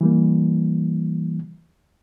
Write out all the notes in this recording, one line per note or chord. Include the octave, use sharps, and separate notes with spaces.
E3 G3 A#3